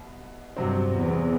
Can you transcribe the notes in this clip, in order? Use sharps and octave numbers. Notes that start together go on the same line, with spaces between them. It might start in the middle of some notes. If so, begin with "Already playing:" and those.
Already playing: C2 B2
G2 C3 F#3 C4
E2